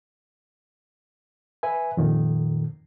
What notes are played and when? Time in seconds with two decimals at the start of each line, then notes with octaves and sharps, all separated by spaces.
1.63 B4 E5 G#5
1.97 F2 A#2 D#3